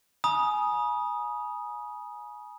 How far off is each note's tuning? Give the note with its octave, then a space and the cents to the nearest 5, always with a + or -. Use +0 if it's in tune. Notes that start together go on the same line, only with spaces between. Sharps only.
G#5 +20 B5 -45 D#6 +0